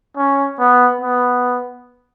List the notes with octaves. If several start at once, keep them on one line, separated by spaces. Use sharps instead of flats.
C#4
B3
B3